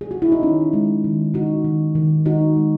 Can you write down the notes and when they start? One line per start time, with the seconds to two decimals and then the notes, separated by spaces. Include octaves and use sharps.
0.01 G#4
0.11 F#4
0.22 E4
0.32 D#4
0.42 D#3 C#4
0.73 G#3
1.04 D#3
1.34 D#3 D#4 F#4
1.65 D#3
1.95 D#3
2.26 G#3 D#4 F#4
2.56 G#3